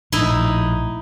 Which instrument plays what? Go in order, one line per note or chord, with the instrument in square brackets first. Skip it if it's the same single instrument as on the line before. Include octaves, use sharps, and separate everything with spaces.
[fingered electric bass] A#1 A2 [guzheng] D#4 E4